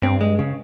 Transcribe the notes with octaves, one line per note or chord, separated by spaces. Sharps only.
G2 C4
G#3
C#3